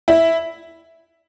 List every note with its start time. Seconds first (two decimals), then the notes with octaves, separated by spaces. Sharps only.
0.08 E4